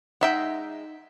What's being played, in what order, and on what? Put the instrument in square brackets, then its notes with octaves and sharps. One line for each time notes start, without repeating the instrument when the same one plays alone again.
[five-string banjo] G#3 E5 G5 [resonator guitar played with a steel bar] D#4 F#5